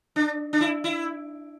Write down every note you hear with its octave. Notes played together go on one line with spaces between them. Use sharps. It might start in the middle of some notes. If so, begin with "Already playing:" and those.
D4
D4
E4
E4